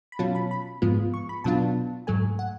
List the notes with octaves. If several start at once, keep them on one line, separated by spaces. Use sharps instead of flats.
B5
B2 F#3 C#4 F4 A5
B5
B5
G#2 F3 G#3 B3 F4
C#6
B5
B2 F#3 B3 D4 F4 A5
G#2 F#3 A3 G#5
F#5